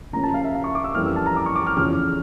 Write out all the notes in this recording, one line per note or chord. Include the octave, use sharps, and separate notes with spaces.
C#3 F3 A#3 C#4 A#5
A5
F5
E5
F5
C#6
D6
E6
F2 E3 G3 A#3 C#4 F6
E6
A5
A#5
D6
C#6
D6
F6
E2 C#3 F3 C#4 F6